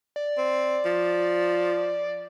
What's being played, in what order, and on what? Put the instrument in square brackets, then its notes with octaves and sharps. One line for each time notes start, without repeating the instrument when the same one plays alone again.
[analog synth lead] D5
[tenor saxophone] C4
F3